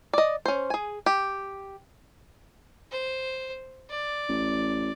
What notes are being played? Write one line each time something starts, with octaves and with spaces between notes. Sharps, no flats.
D5 D#5
C#4 C5
G#4 G#5
G4
C5
D5
A1